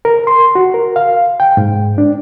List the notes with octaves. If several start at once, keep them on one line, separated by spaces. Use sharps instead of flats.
A#4
C6
F#4
A#4
F5
G5
G#2
D4